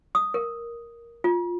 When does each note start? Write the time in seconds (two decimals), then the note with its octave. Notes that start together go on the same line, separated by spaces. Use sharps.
0.15 D#6
0.34 A#4
1.24 F4